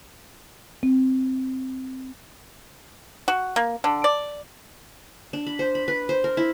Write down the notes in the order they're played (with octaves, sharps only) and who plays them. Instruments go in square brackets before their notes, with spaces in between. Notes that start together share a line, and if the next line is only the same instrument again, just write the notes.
[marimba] C4
[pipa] F#4
A#3
D3
D5
[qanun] D4
B5
C5
B5
B4
C5
A#4
E4